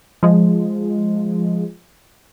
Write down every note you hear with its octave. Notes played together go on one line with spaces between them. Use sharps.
F3 G#3